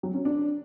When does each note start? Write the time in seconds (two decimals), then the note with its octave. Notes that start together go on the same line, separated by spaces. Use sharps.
0.03 F#3
0.14 C#4
0.25 D4